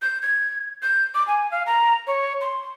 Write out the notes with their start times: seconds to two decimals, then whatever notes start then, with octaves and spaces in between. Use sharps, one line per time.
0.02 G6
0.22 G#6
0.82 G6
1.14 D6
1.27 G#5
1.51 F5
1.66 A#5
2.07 C#5
2.41 C6